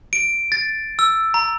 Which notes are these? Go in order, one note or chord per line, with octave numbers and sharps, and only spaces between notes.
D7
A6
E6
A#5